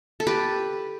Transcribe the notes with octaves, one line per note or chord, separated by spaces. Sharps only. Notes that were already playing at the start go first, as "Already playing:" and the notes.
A4
G4 B4